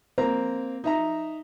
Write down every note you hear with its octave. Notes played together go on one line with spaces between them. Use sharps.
A#3 C4 A#5
D#4 E5 A#5